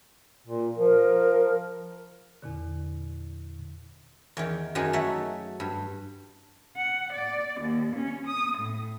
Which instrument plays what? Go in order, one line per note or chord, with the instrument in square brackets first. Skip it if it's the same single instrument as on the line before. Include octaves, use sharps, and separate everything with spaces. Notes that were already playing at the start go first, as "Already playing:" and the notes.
[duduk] A#2
[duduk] F3 [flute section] A#4
[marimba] E2 A#2 D3
[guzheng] E2 D#3
F#2 D#3 F#3 D#4 G#4 G#5
A3 F#4 C#5 E5
G2
[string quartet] F#5
D5
D#2
C#4
D#6
A2